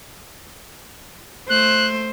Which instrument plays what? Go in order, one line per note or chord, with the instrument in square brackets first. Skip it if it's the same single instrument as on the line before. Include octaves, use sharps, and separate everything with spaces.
[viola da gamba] A3 C5 [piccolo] F#6